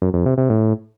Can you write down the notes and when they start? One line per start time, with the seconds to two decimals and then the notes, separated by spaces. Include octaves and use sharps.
0.02 F#2
0.14 F2
0.26 C3
0.38 C3
0.50 A2